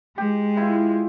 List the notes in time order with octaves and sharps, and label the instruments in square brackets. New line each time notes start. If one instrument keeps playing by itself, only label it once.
[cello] G#3 [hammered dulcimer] G4
[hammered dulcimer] E4 F4